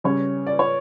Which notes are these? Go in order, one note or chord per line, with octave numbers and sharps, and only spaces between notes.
C#3 G3 C#4 C#5
D5
C#5